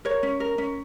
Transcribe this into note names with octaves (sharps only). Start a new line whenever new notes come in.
A#4 C#5
C#4
A#4
C#4